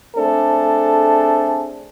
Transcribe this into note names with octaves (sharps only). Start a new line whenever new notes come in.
A3 C4 D4 G#4 A4